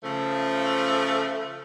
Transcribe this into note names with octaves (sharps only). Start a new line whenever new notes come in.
C#3 F3 A3